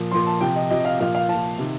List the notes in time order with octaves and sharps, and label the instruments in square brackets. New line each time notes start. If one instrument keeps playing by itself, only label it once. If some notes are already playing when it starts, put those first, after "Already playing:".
Already playing: [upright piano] A#2 F3
A#2 F3 C6
A5
C3 F3 G5
D#5
C3 F3 D#5
F5
A#2 F3 F5
F5
A#2 F3 A5
C3 D#3